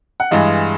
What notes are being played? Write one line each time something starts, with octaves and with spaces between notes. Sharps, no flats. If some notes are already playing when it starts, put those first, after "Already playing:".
F#5
G2 E3 G#3 D#5 F5